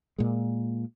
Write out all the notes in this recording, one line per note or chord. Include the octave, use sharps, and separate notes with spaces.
A#2 G#3